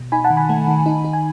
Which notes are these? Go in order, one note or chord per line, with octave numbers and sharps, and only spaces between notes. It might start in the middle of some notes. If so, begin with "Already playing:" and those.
Already playing: B2
D#4 G#5 B5
F#5 A5
D#3
G#5 B5
A3
D#3
D#4
D#4
G#5